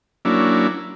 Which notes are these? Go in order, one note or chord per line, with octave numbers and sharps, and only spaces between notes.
F#3 A#3 C#4 D4 E4